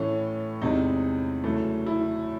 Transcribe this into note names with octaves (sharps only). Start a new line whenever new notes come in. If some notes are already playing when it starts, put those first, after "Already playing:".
Already playing: A2 E3 A3 C#4
E2 C3 E3 G#3 D#4
F#2 C#3 E3 A3
E4